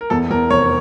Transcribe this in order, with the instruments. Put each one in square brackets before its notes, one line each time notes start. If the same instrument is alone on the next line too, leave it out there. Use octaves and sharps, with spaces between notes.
[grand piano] A#4
[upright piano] E2 [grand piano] A4
[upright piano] E2 [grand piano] A#4
[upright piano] F1 [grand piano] C#5